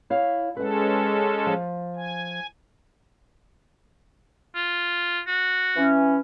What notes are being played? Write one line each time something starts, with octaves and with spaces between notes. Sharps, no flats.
E4 C#5 F5
G#3 C#4 A4 B4 F#5
F3
G#5
F4
F#4
E3 C#4